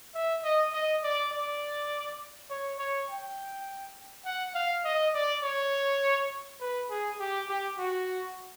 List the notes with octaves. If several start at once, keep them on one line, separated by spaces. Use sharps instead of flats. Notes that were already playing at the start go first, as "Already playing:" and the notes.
E5
D#5
D#5
D5
D5
C#5
C#5
G5
F#5
F5
D#5
D5
C#5
B4
G#4
G4
G4
F#4